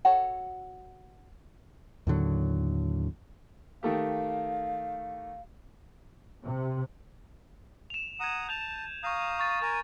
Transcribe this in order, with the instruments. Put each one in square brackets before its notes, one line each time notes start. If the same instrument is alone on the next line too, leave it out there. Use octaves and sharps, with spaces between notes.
[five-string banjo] F#4 A4 C#5
[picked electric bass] D#2 A2 D3 F#3
[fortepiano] D#3 A3 G4 [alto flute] F5
[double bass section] C3
[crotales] E7 F7
[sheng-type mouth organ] F#5 A#5 D#6 [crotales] G#6 D#7
[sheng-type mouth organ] A5 [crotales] G6 F7
[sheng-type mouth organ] F5 A#5 D#6 [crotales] C#6 G6
[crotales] C#6 A6 D#7
[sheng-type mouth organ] A#4 G#5 A#5 [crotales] A6